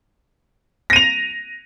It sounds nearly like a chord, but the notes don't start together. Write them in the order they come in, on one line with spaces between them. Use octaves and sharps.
A#6 D#7 F7